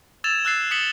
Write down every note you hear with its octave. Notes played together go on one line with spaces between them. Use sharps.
E6 G#6 A6 E7 F7
E6 F#6 A6 C7
D#6 B6 C#7 E7 F#7 G7